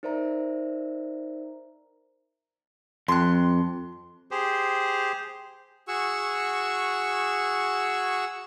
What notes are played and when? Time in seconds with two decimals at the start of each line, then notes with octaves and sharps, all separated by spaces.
0.03 D#4 A#4 C5 D5 E5 A#5
3.08 F2 C6 F#6
4.31 G4 G#4 C5
5.88 F#4 G#4 C#6 E6